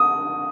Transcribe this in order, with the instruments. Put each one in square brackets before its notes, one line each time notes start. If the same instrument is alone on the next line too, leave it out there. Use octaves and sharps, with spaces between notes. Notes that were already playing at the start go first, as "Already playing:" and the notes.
Already playing: [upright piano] D#6